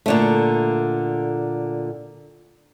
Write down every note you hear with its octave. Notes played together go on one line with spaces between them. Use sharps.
A#2 D3 A3